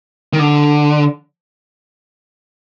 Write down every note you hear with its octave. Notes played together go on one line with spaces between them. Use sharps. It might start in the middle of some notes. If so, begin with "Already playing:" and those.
D#3
D3